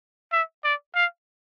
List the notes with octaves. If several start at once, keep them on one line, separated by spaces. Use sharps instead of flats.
E5
D5
F5